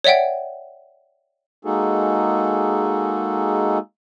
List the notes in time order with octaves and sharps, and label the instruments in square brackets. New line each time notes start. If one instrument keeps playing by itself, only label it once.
[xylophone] C#5 D5 E5 F#5 G5
[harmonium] G#3 A#3 D#4 F#4 G#4 A4